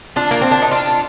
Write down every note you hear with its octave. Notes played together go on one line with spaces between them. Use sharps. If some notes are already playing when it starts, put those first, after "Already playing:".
D4 F4
A#3
C4
D4
D#4
D4 F4